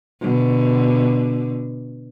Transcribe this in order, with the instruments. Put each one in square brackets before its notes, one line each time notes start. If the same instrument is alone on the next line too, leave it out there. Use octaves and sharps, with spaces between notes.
[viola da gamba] B2 D3